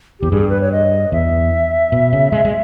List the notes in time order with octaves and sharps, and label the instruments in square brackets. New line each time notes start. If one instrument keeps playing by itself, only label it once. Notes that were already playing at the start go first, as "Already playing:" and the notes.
[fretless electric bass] E2 [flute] G4
[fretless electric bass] G2 [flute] G#4
[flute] B4
C#5
D#5
[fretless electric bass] E2 [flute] E5
[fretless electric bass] B2
C#3
G#3
G#3